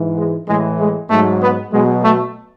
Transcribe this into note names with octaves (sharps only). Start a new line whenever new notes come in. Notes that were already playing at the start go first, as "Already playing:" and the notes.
Already playing: G#2 E3
G#3
A2 E3 G#3
G#3
G#2 F#3 A3
B3
B2 F#3 G#3
A3